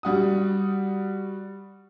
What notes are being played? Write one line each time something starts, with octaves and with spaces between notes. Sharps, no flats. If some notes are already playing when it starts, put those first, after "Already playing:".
G3 F#4 D#6